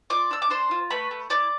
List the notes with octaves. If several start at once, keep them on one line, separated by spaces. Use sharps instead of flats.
F4 D5 D6
D4 E6
D6
D4 C5 C6
F4
A3 B4 B5
A3
E4 D5 D6